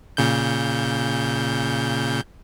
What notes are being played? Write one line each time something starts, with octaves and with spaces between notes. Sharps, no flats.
A#2 C#3 G6